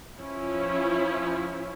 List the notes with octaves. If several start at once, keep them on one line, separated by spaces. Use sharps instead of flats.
F3 C#4 E4